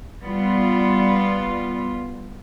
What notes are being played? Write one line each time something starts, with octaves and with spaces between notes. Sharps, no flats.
G3 B3 F4